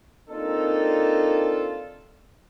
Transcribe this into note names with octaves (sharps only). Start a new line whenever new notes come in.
A#3 C4 D4 D#4 F4 A4